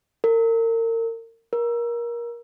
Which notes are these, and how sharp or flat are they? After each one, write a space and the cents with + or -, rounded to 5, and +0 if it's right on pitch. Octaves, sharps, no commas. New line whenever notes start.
A#4 -35
A#4 +20